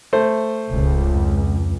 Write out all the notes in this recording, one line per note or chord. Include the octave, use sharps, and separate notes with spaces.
A3 C5
D1 C#2
F2